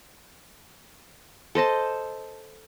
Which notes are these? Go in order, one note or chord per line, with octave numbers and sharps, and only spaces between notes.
A4 C5 D#5 A5